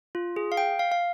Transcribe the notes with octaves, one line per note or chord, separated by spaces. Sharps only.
F4
G#4
F5
G5
F5
F5